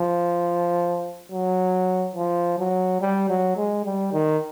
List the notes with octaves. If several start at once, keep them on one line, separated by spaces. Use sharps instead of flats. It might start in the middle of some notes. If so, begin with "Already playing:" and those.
Already playing: F3
F#3
F3
F#3
G3
F#3
G#3
G3
D#3